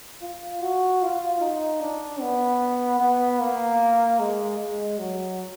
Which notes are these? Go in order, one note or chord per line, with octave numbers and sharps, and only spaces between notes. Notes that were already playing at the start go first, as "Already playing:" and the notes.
F4
F#4
F4
D#4
D4
B3
B3
A#3
G#3
G#3
F#3